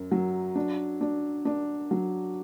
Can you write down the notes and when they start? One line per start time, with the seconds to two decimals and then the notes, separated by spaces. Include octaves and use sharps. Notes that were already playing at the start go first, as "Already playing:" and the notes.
Already playing: F#2
0.12 F#3
0.55 D4
1.01 D4
1.45 D4
1.91 F#3